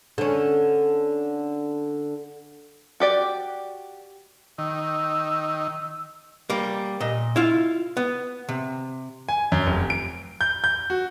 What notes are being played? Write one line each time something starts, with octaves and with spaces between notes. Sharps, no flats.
D3 C#4
F#4 G4 D5
D#3 E6
G3 A#3
A#2 D#5
E4 F4 F5
B3
C3
G#5
F#2
F1
D7
G6
G6
F#4